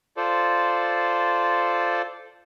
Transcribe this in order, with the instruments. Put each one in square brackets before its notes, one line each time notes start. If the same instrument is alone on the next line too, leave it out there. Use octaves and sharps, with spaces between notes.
[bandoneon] F4 A4 C5 D5